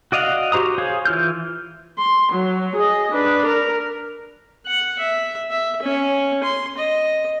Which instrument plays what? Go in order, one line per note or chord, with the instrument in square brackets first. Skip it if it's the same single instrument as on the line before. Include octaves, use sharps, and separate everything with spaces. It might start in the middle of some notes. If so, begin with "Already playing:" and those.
[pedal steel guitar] F#4 D5 D#5 F5 F#5
F#4 G4 C5 A#5 D#6
G#4 C5 C#5 F5
E3 F4 F6 G6
[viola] C6
F#3
G#4 D#5
D4 B4
A#4
[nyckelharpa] F#5
E5
E5
C#4
C6
D#5